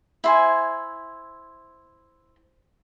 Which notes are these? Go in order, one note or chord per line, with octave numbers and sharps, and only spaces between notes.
E4 C5 G#5